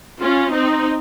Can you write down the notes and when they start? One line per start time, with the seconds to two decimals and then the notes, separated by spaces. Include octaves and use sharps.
0.20 C#4 F4
0.51 C4 D#4